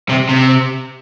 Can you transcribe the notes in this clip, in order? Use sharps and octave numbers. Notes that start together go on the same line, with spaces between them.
C3
C3